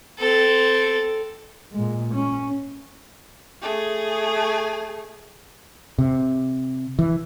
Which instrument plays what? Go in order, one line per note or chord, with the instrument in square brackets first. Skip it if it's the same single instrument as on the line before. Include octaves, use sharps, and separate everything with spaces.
[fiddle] C4 A4
[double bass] A#2 G#3
C#4
[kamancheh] A3 G#4
[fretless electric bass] C3
E3